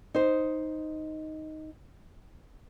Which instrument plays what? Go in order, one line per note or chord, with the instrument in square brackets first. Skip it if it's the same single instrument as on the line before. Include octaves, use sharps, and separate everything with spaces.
[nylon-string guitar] D#4 C5